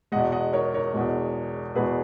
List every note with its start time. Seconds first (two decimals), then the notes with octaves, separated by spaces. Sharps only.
0.12 E2 B2 G#3 D#5 F#5
0.32 D#5 F#5
0.53 A#4 C#5
0.74 A#4 C#5
0.94 E2 B2 G#3
1.76 E2 B2 G#3 G#4 B4